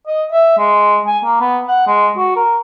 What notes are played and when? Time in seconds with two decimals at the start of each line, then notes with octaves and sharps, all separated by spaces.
0.07 D#5
0.32 E5
0.58 G#3
1.07 G#5
1.25 A#3
1.41 B3
1.68 F#5
1.88 G#3
2.17 F#4
2.36 A#4